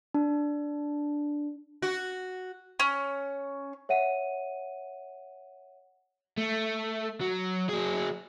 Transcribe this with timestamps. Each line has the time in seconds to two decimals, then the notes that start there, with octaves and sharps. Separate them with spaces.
0.14 D4
1.82 F#4
2.80 C#4
3.89 C#5 E5 F#5 D#7
6.37 A3
7.21 F#3
7.69 F#3 G#4